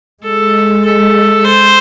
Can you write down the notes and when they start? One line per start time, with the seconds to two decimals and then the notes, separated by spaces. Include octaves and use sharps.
0.24 G#3 A4
0.85 A4
1.44 C5